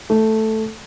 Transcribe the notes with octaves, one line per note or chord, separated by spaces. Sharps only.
A3